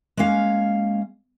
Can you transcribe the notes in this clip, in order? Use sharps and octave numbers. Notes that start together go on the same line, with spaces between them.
G#3 A#3 C#4 F5